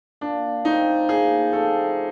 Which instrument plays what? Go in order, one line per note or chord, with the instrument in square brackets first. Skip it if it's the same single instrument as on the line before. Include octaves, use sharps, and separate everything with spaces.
[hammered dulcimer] A#2 [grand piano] D4
[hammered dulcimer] F3 A3 C4 [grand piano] D#4
[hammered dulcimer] A#2 [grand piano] G#4
[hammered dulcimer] F3 A3 C4 [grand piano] A4